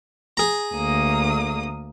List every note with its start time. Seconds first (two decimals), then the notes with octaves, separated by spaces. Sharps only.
0.37 G#4 A#5
0.74 D2 A#3 D#6